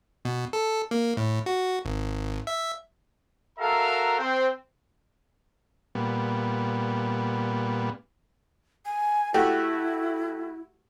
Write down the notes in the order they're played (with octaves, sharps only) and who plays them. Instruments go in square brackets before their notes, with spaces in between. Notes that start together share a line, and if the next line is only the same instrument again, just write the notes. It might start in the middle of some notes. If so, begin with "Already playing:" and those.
[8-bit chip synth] B2
A4
A#3
A2
F#4
G#1
E5
[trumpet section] F#4 A4 A#4 E5 F5 A#5
C4 C5
[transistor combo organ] A#2 G3 B3
[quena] G#5
[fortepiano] A3 F#4 G4 [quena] E4